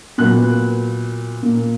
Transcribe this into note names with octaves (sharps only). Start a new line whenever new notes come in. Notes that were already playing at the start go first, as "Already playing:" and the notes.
A#2 F#3 B3 F#6
A#2 A#3